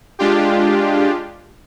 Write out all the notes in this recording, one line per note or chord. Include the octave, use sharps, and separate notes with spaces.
G#3 D4 F4 G4